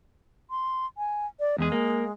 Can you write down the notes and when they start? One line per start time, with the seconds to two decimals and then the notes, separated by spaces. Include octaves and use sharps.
0.50 C6
0.98 G#5
1.40 D5
1.58 E2 G#3 G#4
1.72 A#3